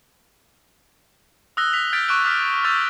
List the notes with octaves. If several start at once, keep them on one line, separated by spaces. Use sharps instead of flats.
D#6 E6 F#6 A#6 G7
B6 F7
F6 G6 A6 B6 D7
C#6 D6 F#6 D7
D6 D#6 F6 B6
C#6 E6 G6 A6 F7